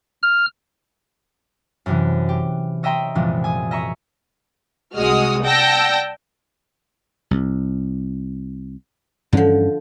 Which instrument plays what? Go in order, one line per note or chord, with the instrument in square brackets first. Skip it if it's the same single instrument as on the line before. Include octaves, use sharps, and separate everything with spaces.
[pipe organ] F6
[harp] F#2 C3 E3
G4
C#5 D#5 E5 G5 A#5 C6
C2 F#2 A#2 E3 F3 G#3
G#5 D#6
D#5 E5 A#5 C#6
[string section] C2 G#3 F#4 D#5 D#6 F6
D5 F#5 G5 A5 E6 A#6
[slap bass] C2
[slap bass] G2 E3 C#4 [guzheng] D3 F3